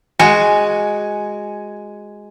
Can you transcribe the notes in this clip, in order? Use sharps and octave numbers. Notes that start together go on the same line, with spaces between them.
G#3 F#4 G#5